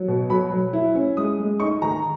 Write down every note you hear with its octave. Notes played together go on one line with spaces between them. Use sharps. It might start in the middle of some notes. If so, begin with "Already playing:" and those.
Already playing: F#3
B2
F#3 B5
F#3
E4
C#4
G#3 D#6
G#3
D#4 C#6
D#3 A#5